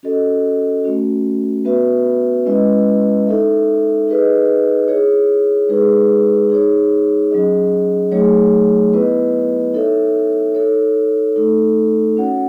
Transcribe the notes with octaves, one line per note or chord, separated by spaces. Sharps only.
C#4 F#4 A4 D#5
A3 C#4 F#4
B3 F#4 B4 E5
G#3 C#4 E4 B4 D#5
D#4 A4 E5
D#4 G#4 B4 D#5
E4 G#4 C#5
G#3 D#4 G#4 B4
D#4 G#4 C#5
F#3 C#4 G#4 D#5
F#3 A3 D#4 G#4 C#5
B3 E4 B4 D#5
D#4 A4 C#5 E5
D#4 A4 C#5
A3 D#4 A4
C#4 F#4 C#5 F#5